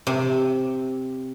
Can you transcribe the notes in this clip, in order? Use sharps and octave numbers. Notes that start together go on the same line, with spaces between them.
C3